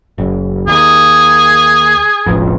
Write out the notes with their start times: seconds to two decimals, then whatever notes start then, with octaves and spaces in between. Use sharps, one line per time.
0.18 F#1
0.68 D#2 G#4
2.26 E1 A1 F2